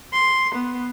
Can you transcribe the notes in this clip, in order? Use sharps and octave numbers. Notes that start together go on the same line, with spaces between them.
C6
B3